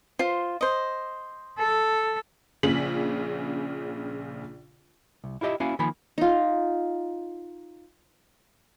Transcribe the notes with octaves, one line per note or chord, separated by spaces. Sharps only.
F4 C5
C5 D#5
A4
A#1 A#2 C#3 G#4 B6 F#7
C2
E4 F4 G4 D#5 E5
A#3 C#4 E4 F#4 F5 G#5
D#3 F3 A#3 G#5 B5
D#4 F4